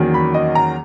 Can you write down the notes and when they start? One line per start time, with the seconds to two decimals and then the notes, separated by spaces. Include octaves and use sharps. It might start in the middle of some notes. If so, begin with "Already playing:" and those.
Already playing: E2 D#3 F#3 A#3 C#4
0.14 B5
0.34 D#5
0.55 A#5